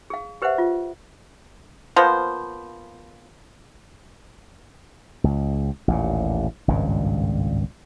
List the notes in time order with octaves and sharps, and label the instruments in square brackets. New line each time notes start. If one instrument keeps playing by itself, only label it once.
[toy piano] G#4 F5
G4 B4 C5 E5 F#5
F4
[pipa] F3 A#3 B3 C5
[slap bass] C#2
A1 D#2 A#2
G#1 C#2 G2 A#2